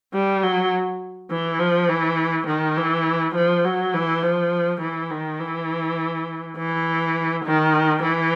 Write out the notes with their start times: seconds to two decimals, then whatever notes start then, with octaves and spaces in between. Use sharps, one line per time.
0.13 G3
0.43 F#3
1.31 E3
1.59 F3
1.89 E3
2.47 D#3
2.77 E3
3.35 F3
3.65 F#3
3.94 E3
4.23 F3
4.81 E3
5.11 D#3
5.40 E3
6.57 E3
7.45 D#3
8.03 E3